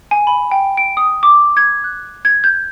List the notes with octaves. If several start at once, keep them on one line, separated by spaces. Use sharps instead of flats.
G#5
B5
G5
D7
D#6
D6
G#6
F#6
G#6
G6